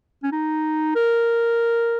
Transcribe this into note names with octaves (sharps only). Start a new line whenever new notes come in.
C#4
D#4
A#4